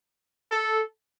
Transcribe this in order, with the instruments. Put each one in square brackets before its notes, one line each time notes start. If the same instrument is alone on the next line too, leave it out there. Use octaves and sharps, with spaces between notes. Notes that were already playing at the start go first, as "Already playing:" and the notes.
[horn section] A4